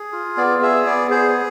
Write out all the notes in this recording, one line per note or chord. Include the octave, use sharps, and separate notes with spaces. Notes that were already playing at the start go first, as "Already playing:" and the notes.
Already playing: G#4
F4
B3 D5
G#4 E5
B3 D5
G#4 C5